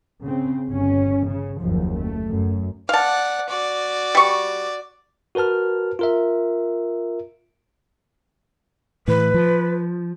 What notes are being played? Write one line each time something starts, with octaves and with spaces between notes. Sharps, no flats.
C#3 C4
G1 C#4
C#3
F#1 D#2 F3
A3
F#2
D5 F5 F#5 A5
F#4 D5
G3 C#6
F#4 A#4 B4 A5 F6
F4 A#4 E5
A2 E3 B4
F3